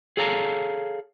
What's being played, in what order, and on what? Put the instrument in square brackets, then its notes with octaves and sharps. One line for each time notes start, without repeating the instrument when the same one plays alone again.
[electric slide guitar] G#4 A4 C#5 F5 A5 A#5